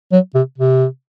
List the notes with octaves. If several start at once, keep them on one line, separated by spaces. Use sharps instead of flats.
F#3
C3
C3